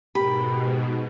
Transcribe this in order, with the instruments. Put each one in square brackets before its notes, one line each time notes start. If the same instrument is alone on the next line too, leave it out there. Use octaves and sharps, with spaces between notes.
[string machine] G#2 B2 [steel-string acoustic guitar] G4 A#4 [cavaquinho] B5